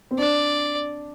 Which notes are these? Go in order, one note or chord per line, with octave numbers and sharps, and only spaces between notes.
C4
D4 D5